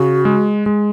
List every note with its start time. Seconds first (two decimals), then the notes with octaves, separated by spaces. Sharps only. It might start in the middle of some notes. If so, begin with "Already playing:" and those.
Already playing: C#3 F#4
0.25 G#3
0.66 G#3